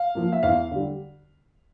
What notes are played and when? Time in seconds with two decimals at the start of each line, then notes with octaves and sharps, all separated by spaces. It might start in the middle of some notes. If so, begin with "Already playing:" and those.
Already playing: F5
0.15 F3 A#3
0.32 E5
0.43 E2 F5
0.71 D3 G3